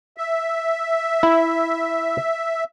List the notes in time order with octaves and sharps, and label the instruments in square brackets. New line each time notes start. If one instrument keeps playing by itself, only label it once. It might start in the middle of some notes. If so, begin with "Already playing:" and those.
[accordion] E5
[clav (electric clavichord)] E4